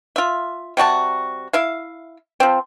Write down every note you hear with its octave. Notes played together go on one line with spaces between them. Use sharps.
F4 E5
C3 G3 F#4 A5
E4 E5 F5
F3 C4